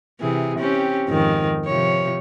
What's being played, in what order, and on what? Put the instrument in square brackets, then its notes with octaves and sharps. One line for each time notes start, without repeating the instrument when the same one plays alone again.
[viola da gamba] C3 E3 G#4
C4 C#4 G4
F2 G#2 D#3
C3 F3 C#5